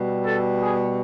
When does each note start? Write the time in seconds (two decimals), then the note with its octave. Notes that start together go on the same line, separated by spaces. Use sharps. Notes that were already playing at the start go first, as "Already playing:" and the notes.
Already playing: B2 G3
0.25 A4
0.61 G#4